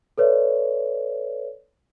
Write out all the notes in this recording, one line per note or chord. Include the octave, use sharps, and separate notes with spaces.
A4 B4 C#5 D5 E5